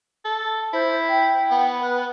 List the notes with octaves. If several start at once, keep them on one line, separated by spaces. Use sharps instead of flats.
A4
E4 C5
G5
B3
B4